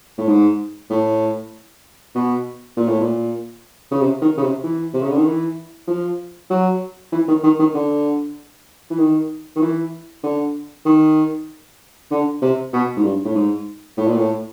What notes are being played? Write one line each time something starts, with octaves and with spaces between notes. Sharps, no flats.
A2
G#2
A2
B2
A#2
A2
A#2
C#3
C3
D#3
C#3
C3
E3
C3
C#3
D3
D#3
E3
F3
F#3
E3
D#3
D#3
D#3
D3
E3
D#3
D#3
E3
D3
D#3
D3
C3
B2
G#2
G2
A2
G#2
A2
A#2
A2